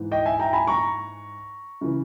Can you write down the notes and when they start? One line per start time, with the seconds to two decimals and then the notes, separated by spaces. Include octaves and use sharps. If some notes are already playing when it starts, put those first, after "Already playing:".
Already playing: G#2 E3
0.12 D#5 G5
0.26 E5 G#5
0.40 G5 A#5
0.53 G#5 B5
0.67 A#5 C#6
1.81 C#3 E3